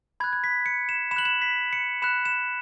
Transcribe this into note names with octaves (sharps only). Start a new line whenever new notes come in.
B5 F#6 G#6
G#6
B6
C#7
E7
B5 E7
F#6 F#7
E7
B6
C#7
B5 F#6 E7
E7